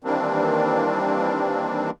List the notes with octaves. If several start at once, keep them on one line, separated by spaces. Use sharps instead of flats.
D#3 E3 G3 A#3 C4 D4